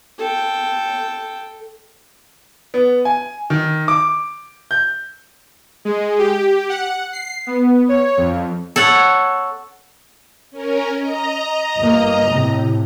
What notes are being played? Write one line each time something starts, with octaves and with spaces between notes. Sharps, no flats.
A4 G5
B3
G#5
D#3
D6
G6
G#3
G4
F#5
C7
B3
C#5
F2
A4 C#5 F#5
C#4 A#4
D#5 A#5
G1 A#3
A2 C3